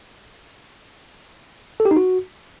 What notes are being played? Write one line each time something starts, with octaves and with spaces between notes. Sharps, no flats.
A4
G4
D#4
F#4